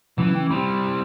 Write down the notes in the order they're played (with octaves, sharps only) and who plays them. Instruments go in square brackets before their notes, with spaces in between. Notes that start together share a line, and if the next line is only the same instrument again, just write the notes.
[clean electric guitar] C#3 F#3 C#4 [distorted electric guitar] E3
[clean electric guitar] A3 C#4 G5
[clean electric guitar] G2 B5 [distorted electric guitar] G3 C4